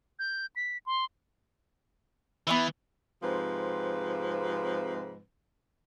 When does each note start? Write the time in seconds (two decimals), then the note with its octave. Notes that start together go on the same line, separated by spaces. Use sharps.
0.19 G6
0.56 B6
0.86 C6
2.47 E3 B3 C#4 E5
3.22 G#2 C3 F3 C4 B4